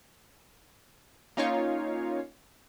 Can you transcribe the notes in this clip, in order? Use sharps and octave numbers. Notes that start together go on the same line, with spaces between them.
A#3 C#4 D#4 F4 C#5 F5